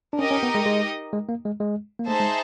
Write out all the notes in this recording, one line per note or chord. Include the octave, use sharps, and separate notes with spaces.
D4
C#4 D#4 G4 A#4 D#5
C#4
B3
G#3
G#3
G#3
A#3
G#3
G#3
A#3
A3 D#4 G#4 C5 E5 A5
G#3